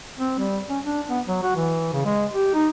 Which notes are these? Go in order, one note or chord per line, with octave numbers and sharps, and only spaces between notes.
C4
G3
C#4
D4
B3
F#3
F#4
E3
C#3
G#3
G4
D#4